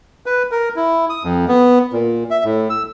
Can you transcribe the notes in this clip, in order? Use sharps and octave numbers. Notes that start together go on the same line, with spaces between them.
B4
A#4
E4
D#6
F2
B3
A#2
E5
A2
E6